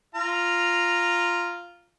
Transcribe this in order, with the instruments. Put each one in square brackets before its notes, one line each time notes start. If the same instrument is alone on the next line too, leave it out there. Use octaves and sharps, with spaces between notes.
[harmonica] F4 A#5